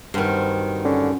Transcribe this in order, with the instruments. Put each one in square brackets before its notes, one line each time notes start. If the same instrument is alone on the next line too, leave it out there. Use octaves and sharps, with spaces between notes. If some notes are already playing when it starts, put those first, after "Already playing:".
[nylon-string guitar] G2 D#3 [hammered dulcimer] F#3 C4 F#4
[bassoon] D3 [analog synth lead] C#4